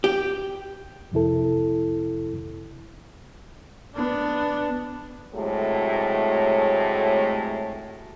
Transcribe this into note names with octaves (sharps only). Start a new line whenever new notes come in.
G4
C2 F2 C3 E4 A4
B3 D4
A2 C3 F#3 G#3 A3